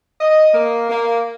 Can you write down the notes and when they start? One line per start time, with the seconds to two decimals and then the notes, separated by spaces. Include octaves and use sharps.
0.20 D#5
0.53 A#3
0.90 A#3